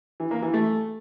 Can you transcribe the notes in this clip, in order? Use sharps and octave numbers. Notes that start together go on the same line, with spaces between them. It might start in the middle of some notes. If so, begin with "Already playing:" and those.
E3
A#3
E3
A3